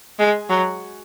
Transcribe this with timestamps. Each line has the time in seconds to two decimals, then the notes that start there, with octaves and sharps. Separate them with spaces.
0.19 G#3
0.49 F#3